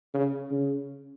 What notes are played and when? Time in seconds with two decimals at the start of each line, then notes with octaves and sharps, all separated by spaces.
0.14 C#3
0.51 C#3